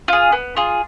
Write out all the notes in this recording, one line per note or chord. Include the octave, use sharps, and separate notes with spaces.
F4 G#4
B3
F4 G#4